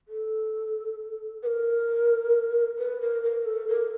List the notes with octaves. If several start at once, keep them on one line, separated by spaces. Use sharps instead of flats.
A4
B4
A#4
B4
A#4
A#4
A4
A#4